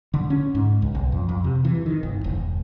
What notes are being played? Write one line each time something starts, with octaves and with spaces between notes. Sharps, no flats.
D3
C#4
G#2
C#2
B1
F2
F2
C3
E3
D#3
G1
E1